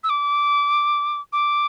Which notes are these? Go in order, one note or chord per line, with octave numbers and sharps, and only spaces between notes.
E6
D6
D6